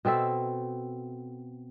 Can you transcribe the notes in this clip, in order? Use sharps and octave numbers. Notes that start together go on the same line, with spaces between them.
B2 C4 A4 E5